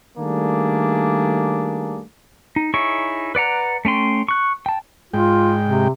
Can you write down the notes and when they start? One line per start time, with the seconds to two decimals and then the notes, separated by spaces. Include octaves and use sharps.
0.18 D#3 G3 A3 A#3 D4 G#4
2.56 D#4
2.74 D#4 E4 G#4 C#5 C#6
3.35 B4 D5 F#5 A#5
3.85 A3 C#4 G5 C6
4.29 C#6 F#6
4.66 G5 A5
5.14 G#2 G#3 F4 G5
5.66 C3